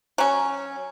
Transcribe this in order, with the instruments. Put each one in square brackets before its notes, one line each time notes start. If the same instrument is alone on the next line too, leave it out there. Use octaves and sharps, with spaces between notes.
[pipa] F#3 C#4